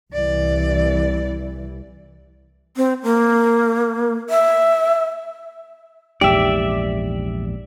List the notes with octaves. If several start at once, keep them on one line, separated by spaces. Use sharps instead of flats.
C2 E3 D5
C4
A#3
E5
A#1 E2 G#2 G4 D5 E5